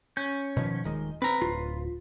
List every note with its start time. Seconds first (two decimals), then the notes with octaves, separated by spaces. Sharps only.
0.17 C#4 G6
0.57 B2 D#3 F3
0.84 D#1 D#3 G#3
1.22 C4 B4 A#5
1.42 D1 F4